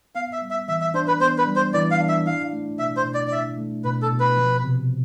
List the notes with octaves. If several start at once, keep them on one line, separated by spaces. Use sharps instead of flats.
B3 F5
E5
G3
E5
E3 E5
E5
D4 C5
B4
B3 C5
B4
G3
C5
E3 D5
F5
D4
E5
E4 F5
A3
B2 E5
C5
B2
D5
D5
E4 E5
A3
B2 B4
A4
B2
B4
F3
C3